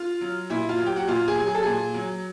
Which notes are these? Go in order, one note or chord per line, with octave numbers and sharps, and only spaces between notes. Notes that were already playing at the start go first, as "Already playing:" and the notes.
Already playing: F4
F#3
A#2 E4
F4
F#3
G4
F#4
A#2 F4
G#4
F#3
G#4
A4
A#2 G#4
F#3